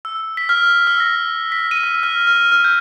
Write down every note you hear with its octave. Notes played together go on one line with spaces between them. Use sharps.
E6
B6
F6
E6
A#6
B6
D#7
E6
F6
F6
F6
G6